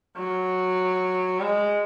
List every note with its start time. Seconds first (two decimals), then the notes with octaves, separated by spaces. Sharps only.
0.17 F#3
1.40 G#3